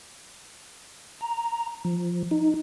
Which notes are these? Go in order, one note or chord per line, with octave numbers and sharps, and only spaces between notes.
A#5
F3
D#4